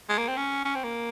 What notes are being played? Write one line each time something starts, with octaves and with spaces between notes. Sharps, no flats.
G#3
A#3
C4
C#4
C#4
C4
A#3